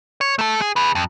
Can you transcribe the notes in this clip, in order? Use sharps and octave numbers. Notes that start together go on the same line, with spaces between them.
C#5
A3 A4
G#4
G#4 B4
F2